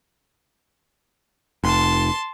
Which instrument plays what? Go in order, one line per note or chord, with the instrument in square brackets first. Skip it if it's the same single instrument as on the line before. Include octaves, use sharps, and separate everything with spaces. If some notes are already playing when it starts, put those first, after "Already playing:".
[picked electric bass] F1 [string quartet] A5 C6